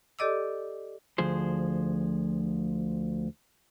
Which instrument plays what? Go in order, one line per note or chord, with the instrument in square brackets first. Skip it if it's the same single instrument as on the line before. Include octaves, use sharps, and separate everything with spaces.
[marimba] G4 A4 D5 D#5 D6 E6
[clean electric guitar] D2 F3 G#4 C5